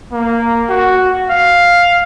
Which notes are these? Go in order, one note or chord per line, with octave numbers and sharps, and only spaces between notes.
A#3
F#4
F5